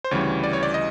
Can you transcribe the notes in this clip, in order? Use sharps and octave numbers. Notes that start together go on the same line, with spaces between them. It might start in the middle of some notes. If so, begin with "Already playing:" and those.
C5
D2 C#3 E3 G3 C#5
D5
C#5
D5
D#5